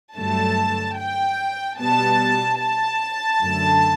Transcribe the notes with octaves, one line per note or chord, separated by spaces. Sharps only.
G2 D3 F#3 A3 A5
G5
B2 G3 B3 A5
A5
F#2 D3 A3